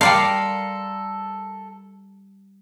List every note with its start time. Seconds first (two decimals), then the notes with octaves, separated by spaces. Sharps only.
0.01 G3 A4 A#4 D5 F5 C6